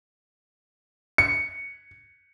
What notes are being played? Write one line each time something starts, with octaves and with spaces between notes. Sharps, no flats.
C#7